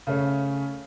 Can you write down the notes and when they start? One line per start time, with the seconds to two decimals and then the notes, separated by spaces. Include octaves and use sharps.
0.07 C#3 A3 C#4